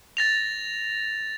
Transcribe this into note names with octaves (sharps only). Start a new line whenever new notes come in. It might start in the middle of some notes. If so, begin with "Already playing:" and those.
A6 A#6 F7